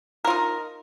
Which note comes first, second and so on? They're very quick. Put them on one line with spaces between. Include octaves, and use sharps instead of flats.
A#4 F4 D#4